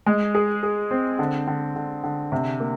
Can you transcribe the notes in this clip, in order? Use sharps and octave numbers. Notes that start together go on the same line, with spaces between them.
G#3
G#4
G#4
C4
D3
D3
D3
D3
C3
A#3